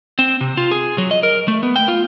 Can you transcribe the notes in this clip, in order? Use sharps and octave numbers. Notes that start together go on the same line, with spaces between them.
C4
C3
F4
G#4
F#3
D#5
A#4
A3
B3
G5
F4